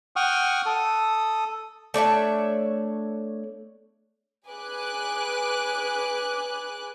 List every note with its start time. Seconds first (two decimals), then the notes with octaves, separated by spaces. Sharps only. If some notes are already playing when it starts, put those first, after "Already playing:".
0.16 F#5 G5 C#6 D#6 F6
0.66 A4 D#6
1.94 A3 D4 C#5 E5
4.48 G#4 B4 G#5 D6 F#6